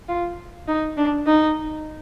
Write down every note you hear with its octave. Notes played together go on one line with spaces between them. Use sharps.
F4
D#4
D4
D#4